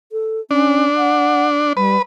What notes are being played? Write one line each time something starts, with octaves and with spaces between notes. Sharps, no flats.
A4
C#4 D4
F#5
G3 B4